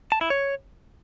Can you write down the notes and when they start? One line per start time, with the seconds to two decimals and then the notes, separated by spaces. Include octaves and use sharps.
0.12 A5
0.21 E4
0.30 C#5